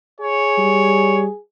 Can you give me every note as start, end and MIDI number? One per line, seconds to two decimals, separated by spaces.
0.20 1.39 68
0.20 1.22 73
0.58 1.27 55